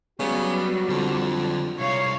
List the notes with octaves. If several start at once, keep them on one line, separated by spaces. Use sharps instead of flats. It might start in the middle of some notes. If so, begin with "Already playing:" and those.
C#3 F#3 G3 B3 F#4
F2 D3
C2 C#5 F5